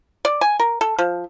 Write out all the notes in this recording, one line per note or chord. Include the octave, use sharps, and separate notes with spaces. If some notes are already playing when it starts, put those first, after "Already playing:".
D5
G#5
A#4
A4
F3